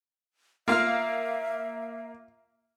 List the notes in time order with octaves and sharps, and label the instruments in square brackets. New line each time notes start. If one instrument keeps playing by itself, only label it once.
[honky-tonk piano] A#3 F5 [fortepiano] F4 F6 [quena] E5